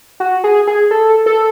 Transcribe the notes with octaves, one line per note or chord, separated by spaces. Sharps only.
F#4
G#4
G#4
A4
A4